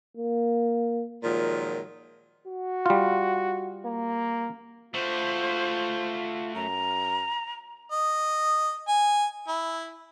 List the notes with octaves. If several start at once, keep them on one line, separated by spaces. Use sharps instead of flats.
A#3
A#2 D#3 F3 F#3 G#3
F#4
G3 F4
A#3
A3 F4 F#4 C5
F#2 A#5
D#5
G#5
E4